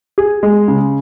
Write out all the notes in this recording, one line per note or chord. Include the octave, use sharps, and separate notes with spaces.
G#4
G#3
C#3